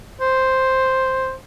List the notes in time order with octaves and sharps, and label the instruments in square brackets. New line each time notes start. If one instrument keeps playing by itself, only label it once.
[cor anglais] C5